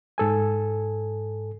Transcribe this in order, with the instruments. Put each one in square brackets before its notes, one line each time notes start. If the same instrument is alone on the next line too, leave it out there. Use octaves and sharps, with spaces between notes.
[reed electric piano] G#2 A4 G#5